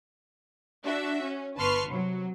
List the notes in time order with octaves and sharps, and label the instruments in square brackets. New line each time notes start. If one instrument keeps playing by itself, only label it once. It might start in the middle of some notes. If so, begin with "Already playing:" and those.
[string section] D4 F#4 E5
C#4
G1 B4 A5 C6 C#6 F6
C3 F#3